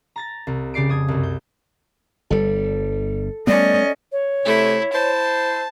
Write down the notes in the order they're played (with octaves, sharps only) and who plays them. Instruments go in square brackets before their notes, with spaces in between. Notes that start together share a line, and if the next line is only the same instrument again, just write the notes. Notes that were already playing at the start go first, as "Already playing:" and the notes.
[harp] A#5 A6 A#6
C2
C#3 G4 D5 C7 D7
F1 D#6 G#6
C2 F#2
G6
[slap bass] G1 G3 [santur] A4
[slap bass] G3 A3 B3 [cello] C#4 D#5 [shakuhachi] D5
[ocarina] C#5
[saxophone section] C3 A3 [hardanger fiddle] E4
[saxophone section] E4 C5 [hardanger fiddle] A5